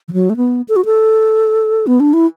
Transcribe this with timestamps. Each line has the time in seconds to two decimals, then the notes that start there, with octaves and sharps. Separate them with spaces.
0.08 E3
0.13 F#3
0.30 A3
0.37 B3
0.69 A4
0.76 F#4
0.85 A4
1.87 B3
2.00 D4
2.13 E4